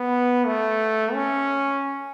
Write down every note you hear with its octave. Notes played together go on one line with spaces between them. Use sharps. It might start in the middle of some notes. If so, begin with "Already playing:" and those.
Already playing: B3
A3
C#4